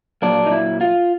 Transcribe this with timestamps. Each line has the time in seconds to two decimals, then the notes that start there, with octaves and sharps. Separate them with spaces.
0.22 A#2 F#3 A#3 D4
0.46 D#4
0.51 E4
0.81 F4